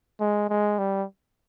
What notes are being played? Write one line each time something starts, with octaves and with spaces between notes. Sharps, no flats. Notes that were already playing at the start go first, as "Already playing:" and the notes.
G#3
G#3
G3